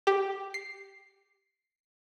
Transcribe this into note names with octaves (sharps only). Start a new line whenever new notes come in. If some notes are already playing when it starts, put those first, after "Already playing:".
G4
C7